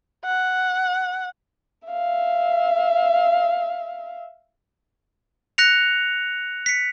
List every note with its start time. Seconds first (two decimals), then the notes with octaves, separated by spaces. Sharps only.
0.25 F#5
1.88 E5 F5
5.58 F#6 A#6 C#7 F7
6.66 B6 C#7